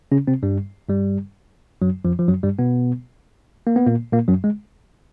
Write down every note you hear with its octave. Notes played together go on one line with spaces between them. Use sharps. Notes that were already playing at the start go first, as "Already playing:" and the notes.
C#3 C#4
C3 C4
G2 G3
G2 G3
F#2 F#3
F2 F3
F3
F#2 F#3
G2 G3
B2 B3
A#3
B3
A#2 A#3
A#2 A#3
F#2 F#3
G#3